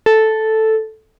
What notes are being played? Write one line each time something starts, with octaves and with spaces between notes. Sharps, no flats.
A4